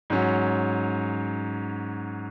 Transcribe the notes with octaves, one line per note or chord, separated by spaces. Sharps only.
G#2 F#3 C#4